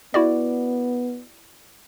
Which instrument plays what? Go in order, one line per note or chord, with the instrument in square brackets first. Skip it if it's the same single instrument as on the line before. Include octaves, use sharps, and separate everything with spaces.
[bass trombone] B3 [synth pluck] E4 F#4 D5